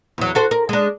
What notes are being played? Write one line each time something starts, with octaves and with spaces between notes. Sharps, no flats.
E2 F#3
F#4 A4 C5
A#4
G#3 D4